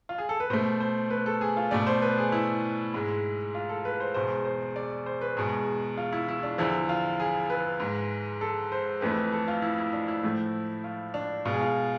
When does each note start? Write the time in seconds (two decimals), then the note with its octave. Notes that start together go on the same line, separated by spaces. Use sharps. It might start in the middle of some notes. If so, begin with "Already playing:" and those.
0.09 F4
0.18 G#4
0.29 A4
0.40 B4
0.50 B2 A3 C5
0.80 C5
1.10 B4
1.26 A4
1.41 G#4
1.57 F4
1.71 B2 A3 D5
1.87 C5
2.02 B4
2.18 G#4
2.32 E4
2.94 G#2 G#3
3.55 F4
3.69 A4
3.85 B4
4.00 C5
4.14 E2 B2 G#3 C5
4.45 C5
4.76 D5
5.06 C5
5.21 B4
5.37 E2 B2 G#3 G#4
5.97 F4
6.13 E4
6.28 E4
6.43 D4
6.58 E2 D3 F3 E4
6.89 F4
7.20 G#4
7.50 B4
7.80 G#2 G#3
8.41 A4
8.72 C5
9.01 F2 E3 A3 B4
9.16 B4
9.32 A4
9.48 F4
9.62 E4
9.78 E4
9.93 D4
10.08 E4
10.23 A2 F3 A3
10.84 F4
11.14 D4
11.45 B2 G#3 F4
11.53 G#4
11.61 F4